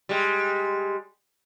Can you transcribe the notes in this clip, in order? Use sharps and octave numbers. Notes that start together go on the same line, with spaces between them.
G3 G#3